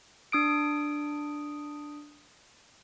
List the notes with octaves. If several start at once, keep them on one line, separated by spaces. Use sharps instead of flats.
D4 D#6 D7